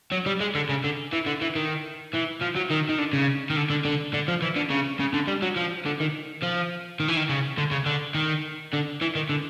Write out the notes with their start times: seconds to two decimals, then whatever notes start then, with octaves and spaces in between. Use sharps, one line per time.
0.12 F#3
0.26 G3
0.40 G#3
0.55 D3
0.69 C#3
0.84 D3
1.13 E3
1.26 D3
1.41 E3
1.55 D#3
2.13 E3
2.41 F3
2.55 F#3
2.70 D#3
2.89 D#3
2.98 D3
3.13 C#3
3.50 D#3
3.56 D3
3.70 D3
3.85 D3
4.14 D3
4.28 F3
4.42 E3
4.56 D3
4.70 C#3
5.00 C#3
5.14 D3
5.28 G3
5.42 F#3
5.56 F3
5.86 D3
6.00 D#3
6.42 F3
7.00 D#3
7.08 E3
7.17 D#3
7.30 C#3
7.58 D3
7.71 C#3
7.86 D3
8.15 D#3
8.73 D3
9.01 E3
9.15 D#3
9.29 D3